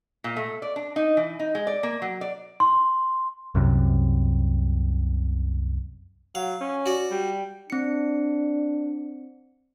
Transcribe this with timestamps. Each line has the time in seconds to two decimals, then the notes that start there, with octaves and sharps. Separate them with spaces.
0.24 A#2
0.36 A3
0.62 D5
0.76 D4
0.96 D#4
1.17 E3
1.39 D#4
1.55 G#3
1.67 D5
1.83 A#3
2.02 F#3
2.21 D5
2.60 C6
3.55 C2 F#2 C3
6.35 F#3 F5
6.61 C#4
6.86 F#4 D5
7.11 G3
7.70 C4 D4 C#7